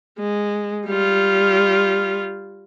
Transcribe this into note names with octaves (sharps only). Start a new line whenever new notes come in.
G#3
G3 F4